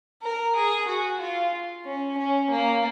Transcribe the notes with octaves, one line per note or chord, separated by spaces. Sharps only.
A#4
G#4
F#4
F4
C#4
C#4
A#3